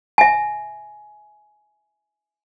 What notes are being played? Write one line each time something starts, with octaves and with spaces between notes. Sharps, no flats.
E5 G#5